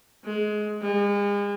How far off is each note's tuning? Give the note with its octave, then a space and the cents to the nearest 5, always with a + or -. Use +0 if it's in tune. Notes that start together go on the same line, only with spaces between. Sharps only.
G#3 +20
G#3 -40